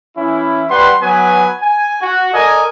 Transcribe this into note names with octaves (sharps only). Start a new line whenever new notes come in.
E3 C#4 E4
G3 B4 F#5 C6
F#3 B3 B4 G#5
G#5
F#4
A4 A#4 D5 D#5 G#5